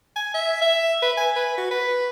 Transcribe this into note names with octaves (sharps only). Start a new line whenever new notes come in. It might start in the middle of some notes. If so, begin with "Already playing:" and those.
G#5
E5
E5
B4
G#5
B4
F#4
B4